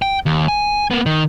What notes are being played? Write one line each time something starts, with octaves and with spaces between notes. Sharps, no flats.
G5
D#2
G#5
A#3 B3
D#3